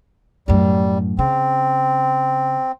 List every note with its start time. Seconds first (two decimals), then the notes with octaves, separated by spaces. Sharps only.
0.48 F#2 A2 G3
1.19 C#3 C4